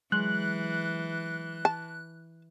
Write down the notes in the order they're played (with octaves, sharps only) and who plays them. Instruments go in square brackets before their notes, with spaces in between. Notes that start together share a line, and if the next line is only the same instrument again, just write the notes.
[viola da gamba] E3 [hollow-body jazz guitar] F#3 G#3 C6 [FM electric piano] F#6
[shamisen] A5